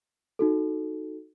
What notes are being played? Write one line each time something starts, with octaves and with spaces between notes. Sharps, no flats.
D#4 F#4 A4